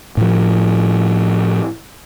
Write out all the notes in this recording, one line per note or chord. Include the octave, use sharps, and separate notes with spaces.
A2 F3